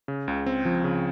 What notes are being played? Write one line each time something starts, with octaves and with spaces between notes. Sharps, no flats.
C#3
C#2
C4
F3
C#3